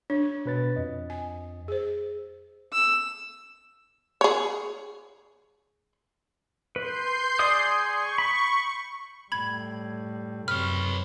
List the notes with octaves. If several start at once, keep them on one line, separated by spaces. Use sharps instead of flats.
D4 C#5
B2 B4 A6
F2 D#5
G#5
G#4 C5
E6
G#4 C#5
B4 C6 G6 C7
G#4 D5 D#6
C#6
B5
A2 G3 B5 G#6
F#2 C3 B4 C#5 F6